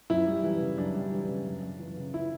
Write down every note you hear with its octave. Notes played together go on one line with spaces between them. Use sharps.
F#2 E4
G3
E3
C#3
F#2 D4
G3
E3
C#3
F#2
F#2
E3
C#3
E4